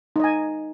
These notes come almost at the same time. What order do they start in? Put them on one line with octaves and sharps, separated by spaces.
D#4 D#5 G#5